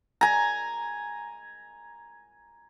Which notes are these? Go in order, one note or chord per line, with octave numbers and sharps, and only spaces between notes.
G#5 A#5